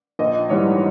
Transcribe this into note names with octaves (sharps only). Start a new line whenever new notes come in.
A#1 D#5
G#2 E3 G3 C#5